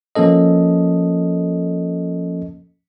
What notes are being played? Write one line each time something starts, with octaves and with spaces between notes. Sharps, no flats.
F3 A#3 C#4 A4 D#5